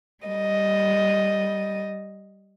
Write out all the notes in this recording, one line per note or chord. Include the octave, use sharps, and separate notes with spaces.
G3 D#5